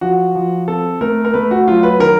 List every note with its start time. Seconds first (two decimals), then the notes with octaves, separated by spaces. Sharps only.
0.01 F3 F#4
0.35 F3
0.68 C4 A4
1.01 A3 A#4
1.25 A#4
1.34 A3 B4
1.51 F#4
1.68 F#3 F4
1.83 B4
2.00 D#3 A#4